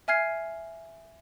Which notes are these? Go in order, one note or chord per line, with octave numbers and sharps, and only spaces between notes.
E5 G#5 F6 G#6 C7